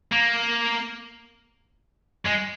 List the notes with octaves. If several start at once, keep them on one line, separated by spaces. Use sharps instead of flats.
A#3
G#3